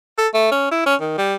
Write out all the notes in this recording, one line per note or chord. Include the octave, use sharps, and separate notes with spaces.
A4
A3
C#4
E4
C#4
D#3
G3